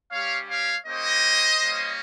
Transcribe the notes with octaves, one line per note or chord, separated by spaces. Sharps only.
G3 C#4 G4 C#5 F5
C#5 F5
A#3 C#4 G4 C5 D#5
G3 A#3 C#4